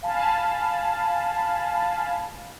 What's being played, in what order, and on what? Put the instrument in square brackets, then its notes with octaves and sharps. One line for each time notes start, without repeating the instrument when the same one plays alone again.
[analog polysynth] F5 G#5 A5 B5